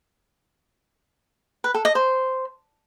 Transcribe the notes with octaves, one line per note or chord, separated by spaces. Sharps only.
B4
A4
D#5
C5